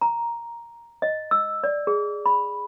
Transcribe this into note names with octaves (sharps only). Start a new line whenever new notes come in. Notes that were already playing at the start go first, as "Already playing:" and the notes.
A#5
D#5
E6
D5
G#4
B5